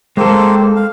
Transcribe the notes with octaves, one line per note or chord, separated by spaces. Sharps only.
G#3 A#3 C4 A4 C5
F5